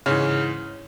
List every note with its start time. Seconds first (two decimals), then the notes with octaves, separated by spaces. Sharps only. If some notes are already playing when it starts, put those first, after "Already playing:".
0.06 G#2 C#3 E3 C#4